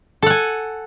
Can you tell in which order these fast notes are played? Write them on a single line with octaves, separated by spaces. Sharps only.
A4 F#5 G#5